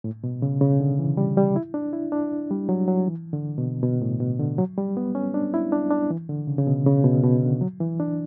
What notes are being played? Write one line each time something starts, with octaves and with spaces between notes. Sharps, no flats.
A2
B2
C#3
C#3
D3
E3
G3
G3
E4
D4
E4
D4
G3
F#3
F#3
E3
D3
B2
B2
A2
B2
D3
F#3
G3
B3
C#4
D4
E4
D4
D4
E3
D3
C#3
C#3
B2
C#3
B2
B2
D3
F#3
E3
D4